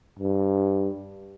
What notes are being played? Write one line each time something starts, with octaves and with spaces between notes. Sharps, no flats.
G2